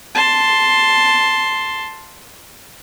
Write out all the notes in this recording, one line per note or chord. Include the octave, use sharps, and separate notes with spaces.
A5 C6